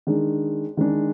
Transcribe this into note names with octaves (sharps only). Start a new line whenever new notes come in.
D#3 G#3 D4 G#4
D#3 G#3 D4 G#4